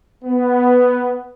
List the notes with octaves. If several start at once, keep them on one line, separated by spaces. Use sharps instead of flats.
B3